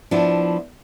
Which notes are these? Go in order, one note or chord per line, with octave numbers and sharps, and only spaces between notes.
F3 B3 D4 E4